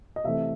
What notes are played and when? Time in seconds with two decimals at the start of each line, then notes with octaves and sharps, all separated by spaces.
0.16 D#5
0.24 C3 E3 A3 E5